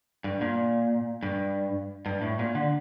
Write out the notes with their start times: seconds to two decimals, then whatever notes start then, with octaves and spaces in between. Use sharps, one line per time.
0.24 G2
0.41 A#2
1.23 G2
2.06 G2
2.21 A2
2.39 A#2
2.55 D3